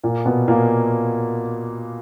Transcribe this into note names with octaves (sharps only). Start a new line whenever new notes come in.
A#2 A#3
B2 B3
A#2 A#3